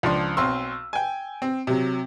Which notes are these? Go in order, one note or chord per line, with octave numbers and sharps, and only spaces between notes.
C#2 F3 D4 C6
B1 C4 C6 E6
G5 G#5
C4
C3 F#3